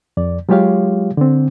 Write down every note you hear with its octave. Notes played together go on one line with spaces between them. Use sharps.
F2 D5
F#3 G#3 F4 G4 C#5 F5
D3 C4